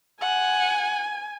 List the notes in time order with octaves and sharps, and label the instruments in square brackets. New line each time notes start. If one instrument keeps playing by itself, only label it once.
[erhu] F#5 [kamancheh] G#5